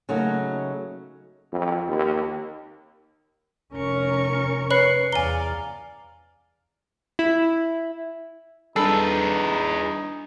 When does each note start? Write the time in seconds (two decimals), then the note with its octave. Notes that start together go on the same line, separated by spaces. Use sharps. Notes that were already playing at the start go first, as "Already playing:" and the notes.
0.09 C#3 F#3 A3 A#3 D#4 F#4
1.53 F2
1.88 D#2
3.74 F1 C#4 A#4 C#6
4.70 B4 C#5 B5 F#6 C7 C#7
5.12 E2 D5 F5 G#5 A#5 G7
7.19 E4
8.76 G3 D4 D#4 G#4 A4 B4